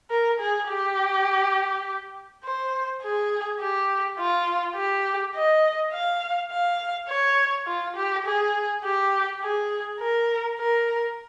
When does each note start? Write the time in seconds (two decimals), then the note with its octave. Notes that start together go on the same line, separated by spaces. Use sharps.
0.10 A#4
0.40 G#4
0.69 G4
2.44 C5
3.03 G#4
3.60 G4
4.19 F4
4.76 G4
5.35 D#5
5.93 F5
6.51 F5
7.09 C#5
7.68 F4
7.96 G4
8.26 G#4
8.84 G4
9.42 G#4
10.00 A#4
10.59 A#4